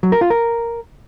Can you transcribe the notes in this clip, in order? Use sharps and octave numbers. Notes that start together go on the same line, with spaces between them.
F#3
A#4
F4
A#4